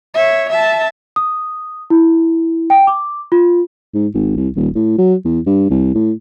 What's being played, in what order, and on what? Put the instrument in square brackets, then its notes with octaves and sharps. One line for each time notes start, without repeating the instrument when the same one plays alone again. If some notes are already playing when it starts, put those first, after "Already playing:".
[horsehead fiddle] C#5 E5
E5 A5
[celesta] D#6
E4
G5
D6
F4
[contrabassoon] G#2
G#1
C2
D#1
A2
F#3
E2
G2
C2
A2